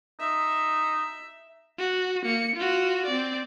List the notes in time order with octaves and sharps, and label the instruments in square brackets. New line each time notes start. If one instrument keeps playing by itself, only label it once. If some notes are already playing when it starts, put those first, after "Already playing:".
[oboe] D#4 [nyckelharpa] E5
[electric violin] F#4
A#3 C#7
F4 F#4
C4 D5